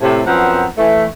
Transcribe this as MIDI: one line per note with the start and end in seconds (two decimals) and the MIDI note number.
0.01 0.21 45
0.01 0.21 48
0.26 0.65 42
0.26 0.65 53
0.26 0.65 59
0.26 0.65 60
0.26 0.65 70
0.26 0.65 78
0.77 1.04 52
0.77 1.04 57